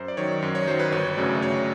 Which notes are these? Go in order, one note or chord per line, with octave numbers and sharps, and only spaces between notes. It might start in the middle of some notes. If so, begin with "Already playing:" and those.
Already playing: F#2 C5
D5
D#3 F#3 C#5
F#2
C#5
D#3 F#3 C5
B4
G1 C#5
F#2 C#3 F#3 A3 D5
G1 C#5